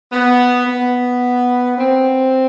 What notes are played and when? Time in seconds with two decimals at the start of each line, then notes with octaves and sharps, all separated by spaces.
0.12 B3
0.67 B3
1.78 C4